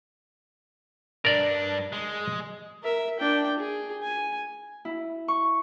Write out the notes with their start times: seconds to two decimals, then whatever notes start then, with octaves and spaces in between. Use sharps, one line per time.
1.25 G2 D4 A#4 D5
1.93 G#3
2.83 A#4 E5
3.19 D4 G5
3.59 G#4
4.02 G#5
4.85 E4
5.28 C#6